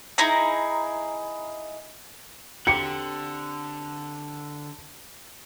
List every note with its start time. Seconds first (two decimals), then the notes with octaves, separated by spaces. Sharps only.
0.18 D#4 E4 G#4 A#5
2.67 D3 C4 G4 C#7